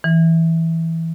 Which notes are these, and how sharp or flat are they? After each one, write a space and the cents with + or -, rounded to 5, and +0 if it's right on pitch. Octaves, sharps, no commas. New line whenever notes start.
E3 -10